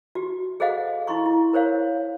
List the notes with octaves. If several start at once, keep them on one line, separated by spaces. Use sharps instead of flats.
F#4 G4
G#4 A4 C5 D#5 F5 F#5
D#4 E4 C6 C#6
E4
A#4 C5 C#5 F5